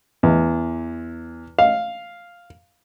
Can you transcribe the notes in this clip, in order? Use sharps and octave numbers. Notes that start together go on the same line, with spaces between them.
E2
F5